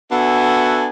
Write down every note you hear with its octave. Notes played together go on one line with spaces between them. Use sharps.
B3 D4 F#4 A4 E5 G#5